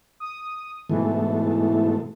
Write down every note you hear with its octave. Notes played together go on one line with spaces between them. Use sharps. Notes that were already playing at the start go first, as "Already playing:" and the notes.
D#6
G#2 B2 E3 A3